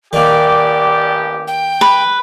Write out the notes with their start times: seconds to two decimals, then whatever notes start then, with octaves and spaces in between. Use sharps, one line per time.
0.13 A1 D#3 A#3 G4 D5
1.47 G5
1.81 B4